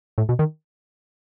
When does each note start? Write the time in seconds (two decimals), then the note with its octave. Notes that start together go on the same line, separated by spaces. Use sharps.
0.18 A2
0.29 B2
0.39 D#3